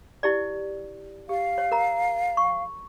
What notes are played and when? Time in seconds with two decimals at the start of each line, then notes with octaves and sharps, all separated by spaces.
0.23 E4 G4 D5
1.29 G4 F5
1.58 C#5
1.72 A#4 A#5
2.37 C#6